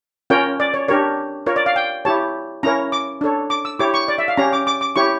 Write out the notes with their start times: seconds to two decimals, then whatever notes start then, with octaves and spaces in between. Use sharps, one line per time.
0.30 C#4 F4 A#4 C#5 G5
0.60 D5
0.74 C#5
0.88 D4 G4 A#4 C#5
1.46 F4 A#4 C#5
1.56 D5
1.66 F5
1.76 G5
2.05 E4 G4 C#5 A5
2.63 C#4 E4 A#4 C#5 A#5
2.92 D6
3.21 D4 A4 C#5
3.50 D6
3.65 E6
3.79 E4 G4 C#5 D6
3.94 C#6
4.08 D5
4.18 E5
4.28 F5
4.37 C#4 G4 C#5 A#5
4.53 D6
4.67 D6
4.81 D6
4.96 E4 G4 C#5 C#6